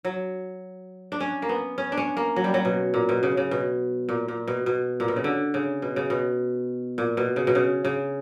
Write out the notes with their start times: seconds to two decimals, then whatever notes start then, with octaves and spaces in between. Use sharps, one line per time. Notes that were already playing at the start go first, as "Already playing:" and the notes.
0.05 F#3
1.12 D4
1.20 C#4
1.42 A#3
1.49 B3
1.78 C#4
1.92 D4
1.97 C#4
2.17 A#3
2.36 F#3
2.44 G3
2.54 F#3
2.65 B2
2.94 A#2
3.09 B2
3.23 C#3
3.37 C#3
3.51 B2
4.09 A#2
4.28 A#2
4.48 B2
4.66 B2
5.00 A#2
5.08 B2
5.16 C#3
5.24 D3
5.54 C#3
5.82 B2
5.96 C#3
6.10 B2
6.98 A#2
7.17 B2
7.36 C#3
7.47 B2
7.55 C#3
7.85 C#3